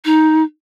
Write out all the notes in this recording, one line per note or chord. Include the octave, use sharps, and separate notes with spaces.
D#4